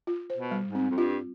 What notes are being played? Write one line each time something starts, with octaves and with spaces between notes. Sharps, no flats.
F4
C5
B2
G3
G#2
C4
F2
G2 F4